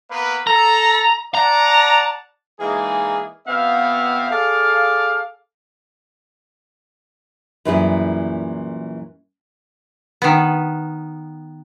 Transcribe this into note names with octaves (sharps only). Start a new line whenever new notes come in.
A#3 B3 B4
A4 A#5
D5 F#5 A5 A#5
E3 G#3 A#3 D#4 G#4
B2 B3 C4 E5 F5
G#4 A4 D5 F5
F#2 A#2 E3 G3 E4 G#4
D#3 B3